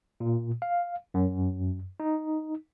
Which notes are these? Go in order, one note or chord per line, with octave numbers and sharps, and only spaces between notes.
A#2
F5
F#2
D#4